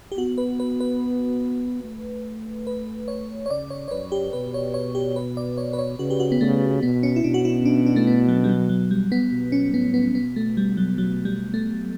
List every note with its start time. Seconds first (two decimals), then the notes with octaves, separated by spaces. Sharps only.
0.12 G4
0.18 B3 F#4
0.38 B4
0.60 B4
0.80 B4
1.83 A3
2.67 B4
3.08 C#5
3.46 C#5
3.50 C#3 D5
3.70 C#5
3.88 C#5
3.91 F#2 B4
4.12 G4
4.33 B2 B4
4.54 C#5
4.74 C#5
4.95 G4
5.16 B4
5.37 D5
5.57 C#5
5.73 B4
5.78 C#5
5.99 C#3 F#4
6.10 G4
6.20 F#4
6.32 B3
6.41 C#3 A3
6.83 B2 B3
7.03 C#4
7.16 E4
7.24 B2 D4
7.34 F#4
7.45 E4
7.65 D4
7.86 D4
7.96 A3
8.07 B3
8.28 F#3
8.44 G3
8.49 F#3
8.69 F#3
8.91 G3
9.12 B3
9.31 B2
9.52 C#4
9.74 A2 B3
9.94 B3
10.15 B2 B3
10.36 A3
10.57 G3
10.77 F#3
10.98 F#3
11.25 G3
11.54 A3